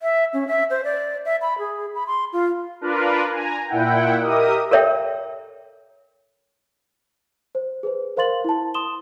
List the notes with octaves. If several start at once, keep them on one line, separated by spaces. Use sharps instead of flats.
E5
C#4
E5
C5
D5
E5
B5
G#4
B5
C6
F4
D4 F4 A#4 B4
G#5 A#5
A#2 E4 F#5 G5
G4 A#4 D#5 E5 D#6
A4 A#4 C#5 E5 G5
C5
G#4 B4 C5
A#4 C5 F5 C6 A6 F#7
E4 A5
C6 D#6 E7 G7